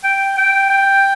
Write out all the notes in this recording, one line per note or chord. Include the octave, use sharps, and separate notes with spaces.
G5
G5
G5